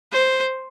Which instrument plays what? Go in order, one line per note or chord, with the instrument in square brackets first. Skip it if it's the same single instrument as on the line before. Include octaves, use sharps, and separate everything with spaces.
[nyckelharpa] C5